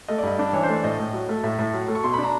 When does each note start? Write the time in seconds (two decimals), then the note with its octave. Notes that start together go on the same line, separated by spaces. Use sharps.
0.08 A3 D#5
0.18 D5
0.23 G2 D#5
0.39 D4
0.53 E3 C#5
0.63 C5
0.69 A3 D5
0.83 A2 D#5
0.99 A2
1.13 F#3
1.29 A3
1.43 A2 E5
1.59 A2
1.74 F#3
1.88 A3
1.95 C#6
2.04 B2 C6
2.14 B5
2.18 D4 A#5